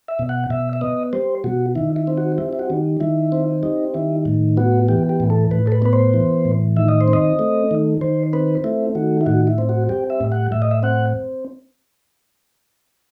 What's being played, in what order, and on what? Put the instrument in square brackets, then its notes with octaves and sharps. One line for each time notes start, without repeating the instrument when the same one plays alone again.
[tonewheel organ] E5
B2
F#5
B2 E5
E5
B3 D#5
G3 C5
B2 F#4
D#3 E4
E4
C4
F#4
G3 E4
E4
F#4
D#3
D#3 E4
C4
G3 D#4
D#3 E4
A2
B3 F#4
E3 G4
G4
A2
A4
A2 B4
A4
B4
B3 B4
C5
E3
A2
D#3 E5
D#5
C5
C4
D#5
A3
D#3
D#3 C5
C4 B4
A3 E4
D#3 F#4
E4
A2 F#4
E4
C4
F#4
G3 G4
E5
A2
F#5
A2 E5
D#5
E5
C4 F#5